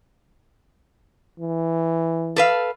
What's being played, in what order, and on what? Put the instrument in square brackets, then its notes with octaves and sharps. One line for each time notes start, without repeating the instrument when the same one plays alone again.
[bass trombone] E3
[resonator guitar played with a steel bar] A4 B4 F5